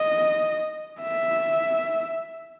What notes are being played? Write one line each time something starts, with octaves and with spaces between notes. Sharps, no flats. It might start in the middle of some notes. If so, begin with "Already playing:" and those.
Already playing: D#5
E5